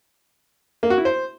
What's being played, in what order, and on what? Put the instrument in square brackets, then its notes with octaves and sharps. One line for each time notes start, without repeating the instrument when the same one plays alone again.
[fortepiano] A#3
F#4
E4
C5